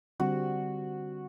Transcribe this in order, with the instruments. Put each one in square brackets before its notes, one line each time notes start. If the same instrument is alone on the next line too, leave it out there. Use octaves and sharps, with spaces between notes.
[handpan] D3 G3 C4 [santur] F#4